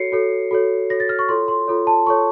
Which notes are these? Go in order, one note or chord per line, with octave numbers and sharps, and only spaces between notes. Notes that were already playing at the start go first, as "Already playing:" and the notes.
Already playing: F#4 A4 C#5 C7 C#7
F#4 A4 C#5
F#4 A4 C#5
F#4 A4 C#5 A#6
A6
F6
C#6
F4 A4 C#5 C6
C6
F4 A4 C#5
A5
F4 A4 C#5 C#6